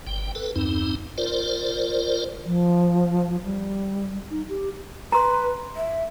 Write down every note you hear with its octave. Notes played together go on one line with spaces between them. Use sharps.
G1 G5
A4 B4
E2 G2 C4 D#4
F4 A#4 C5 D5
F3
G3
D#4
G4
B4 A#5 C6
E5